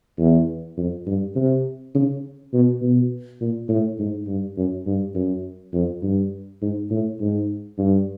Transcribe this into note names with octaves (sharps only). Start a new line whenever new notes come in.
E2
F2
G2
C3
C#3
B2
B2
A#2
A2
G#2
G2
F#2
G2
F#2
F2
G2
G#2
A2
G#2
G2